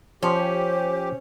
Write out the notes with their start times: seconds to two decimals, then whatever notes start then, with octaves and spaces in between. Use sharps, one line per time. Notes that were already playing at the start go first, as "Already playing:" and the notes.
0.23 F3 C#4 G4 C5